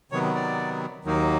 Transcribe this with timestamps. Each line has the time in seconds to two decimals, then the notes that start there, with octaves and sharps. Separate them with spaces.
0.12 C3 D#3 F#3 B3 C#5
0.35 D5
1.05 D#2 D#3 F#3 A#3 D#4